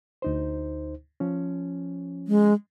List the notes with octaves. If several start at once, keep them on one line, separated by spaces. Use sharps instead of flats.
D2 D#4 C5
F3 C#4
G#3